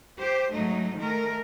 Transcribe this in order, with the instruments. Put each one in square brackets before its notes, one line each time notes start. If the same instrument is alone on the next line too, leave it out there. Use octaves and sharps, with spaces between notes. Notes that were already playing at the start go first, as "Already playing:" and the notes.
[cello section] G4 C5
G#2 F#3 A3 D#4
D#3 A3 A#4